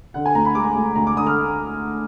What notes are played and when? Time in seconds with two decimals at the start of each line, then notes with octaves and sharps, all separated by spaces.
0.14 D3 F#5
0.26 G#5
0.35 D2 A#5
0.45 B5
0.55 G#3 D6
0.75 D2
0.96 D2 A#5
1.07 D6
1.16 D3 D#6
1.27 F6